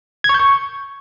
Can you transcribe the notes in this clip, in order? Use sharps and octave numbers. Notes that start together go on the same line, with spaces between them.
G#6
C#6
G6
C#6